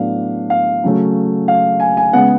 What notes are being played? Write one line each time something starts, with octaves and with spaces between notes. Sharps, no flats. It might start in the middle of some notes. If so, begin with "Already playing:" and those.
Already playing: A2 F#3 B3 D4 F5
F5
C#3 F#3 A3 C#4
F5
G#5
G#5
C#3 G#3 B3 F#5